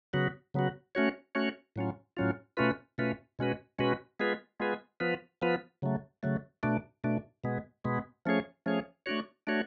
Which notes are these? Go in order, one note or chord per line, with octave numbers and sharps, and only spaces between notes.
C#3 F#3 B3 F#4
C#3 F#3 B3 F#4
A3 C#4 F#4 C#5
A3 C#4 F#4 C#5
A2 F#3 C#4 F4
A2 F#3 C#4 F4
B2 A3 C#4 F4 B4
B2 A3 C#4 F4 B4
B2 G#3 C#4 F#4 B4
B2 G#3 C#4 F#4 B4
G#3 B3 F4 G#4 B4
G#3 B3 F4 G#4 B4
F3 B3 F4 B4
F3 B3 F4 B4
C#3 F#3 A3
C#3 F#3 A3
B2 A3 D4
B2 A3 D4
B2 G#3 B3
B2 G#3 B3
F3 A3 C#4 G#4 C#5
F3 A3 C#4 G#4 C#5
A3 D4 F#4 C#5
A3 D4 F#4 C#5